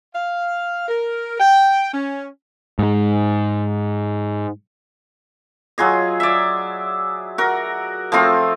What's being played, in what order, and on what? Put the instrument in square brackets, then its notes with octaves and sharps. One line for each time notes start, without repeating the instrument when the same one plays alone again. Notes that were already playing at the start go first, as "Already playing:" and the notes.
[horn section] F5
A#4
G5
C#4
[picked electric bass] G#2 G#3
[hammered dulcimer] F#3 F4 G#4 D#5
D5 E5
F#4 A#4
F3 A3 C4 F4